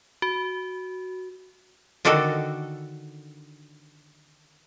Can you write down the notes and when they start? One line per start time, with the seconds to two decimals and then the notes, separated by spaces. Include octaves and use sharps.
0.22 F#4
2.05 D3 D#3 D4 F#4 A4